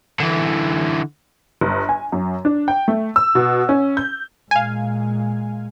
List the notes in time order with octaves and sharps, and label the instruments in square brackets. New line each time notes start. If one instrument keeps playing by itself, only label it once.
[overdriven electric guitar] D3 E3
[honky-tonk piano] G1
G#5
F#2
D4
G5
A3
E6
B2
C#4
G6
[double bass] A#2 G#3 [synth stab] F5 G#5